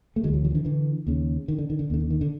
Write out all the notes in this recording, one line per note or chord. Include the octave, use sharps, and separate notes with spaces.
A3
D2 D3 F#3 G#3
E3 F#3
E3 F#3
F3
D3 E3
D3 E3
D#2 C#3
D#3
D3
D#3
D3
D#2 D3
D3
D#3
D3